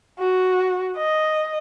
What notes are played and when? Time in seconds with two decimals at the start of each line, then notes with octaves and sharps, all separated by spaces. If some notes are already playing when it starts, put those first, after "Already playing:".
0.19 F#4
0.97 D#5